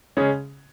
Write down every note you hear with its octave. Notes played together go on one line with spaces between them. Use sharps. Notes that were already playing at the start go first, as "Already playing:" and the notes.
C#3 G#3 C#4 G#4